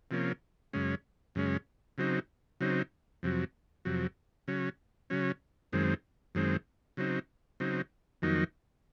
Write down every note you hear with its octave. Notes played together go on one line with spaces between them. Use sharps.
C3 F3 A#3 C#4
F#2 C#3 G#3 C#4
F#2 C#3 G#3 C#4
C#3 F#3 C4 D#4
C#3 F#3 C4 D#4
F2 C3 F#3
F2 C3 F#3
C#3 F#3 C#4
C#3 F#3 C#4
F#2 D#3 G#3 C4
F#2 D#3 G#3 C4
C#3 F#3 C4 D#4
C#3 F#3 C4 D#4
F2 D#3 F#3 A#3 D#4